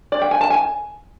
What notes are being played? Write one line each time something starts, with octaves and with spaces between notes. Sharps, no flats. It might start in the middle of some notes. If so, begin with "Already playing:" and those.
D5
G5
G#5
A5
G#5